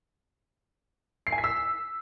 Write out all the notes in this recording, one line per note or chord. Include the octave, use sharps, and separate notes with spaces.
C7
G#5
B6
E6